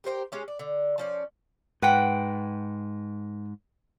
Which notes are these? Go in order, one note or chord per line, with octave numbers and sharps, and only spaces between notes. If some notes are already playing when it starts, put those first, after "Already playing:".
G4 A#4 C5 G5
G#3 C#4 G4
D5
D3
F3 C#4 D5
G#2 B4 F#5 G5